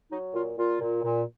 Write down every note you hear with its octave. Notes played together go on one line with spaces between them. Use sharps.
F#3 D#4
A#2 F4
A#2 F4
A#2
A#2